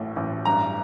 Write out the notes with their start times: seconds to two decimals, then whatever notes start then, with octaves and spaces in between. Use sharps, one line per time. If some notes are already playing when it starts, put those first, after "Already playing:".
Already playing: A1 A2
0.16 A1
0.45 G2 A#5